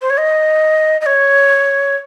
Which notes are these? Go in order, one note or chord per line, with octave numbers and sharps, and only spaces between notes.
C5
C#5
D#5
D#5
C#5